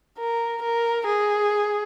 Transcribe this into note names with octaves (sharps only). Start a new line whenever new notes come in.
A#4
A#4
G#4